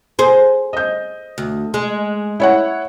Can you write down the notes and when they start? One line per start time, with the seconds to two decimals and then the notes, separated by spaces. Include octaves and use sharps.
0.19 G#4 C5
0.73 D#5 G6
1.38 D2
1.74 G#3
2.40 E4 C#5 F#5